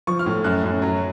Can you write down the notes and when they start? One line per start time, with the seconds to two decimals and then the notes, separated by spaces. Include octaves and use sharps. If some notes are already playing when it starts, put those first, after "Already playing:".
0.07 F3 C#6
0.19 F6
0.26 A2
0.44 F#2 F#6
0.64 F#2
0.82 F#3